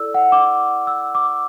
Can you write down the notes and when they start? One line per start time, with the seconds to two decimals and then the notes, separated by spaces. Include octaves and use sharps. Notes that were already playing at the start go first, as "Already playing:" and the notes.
Already playing: E4 A4 D5 E6
0.14 F#5
0.32 D6
0.87 E6
1.15 D6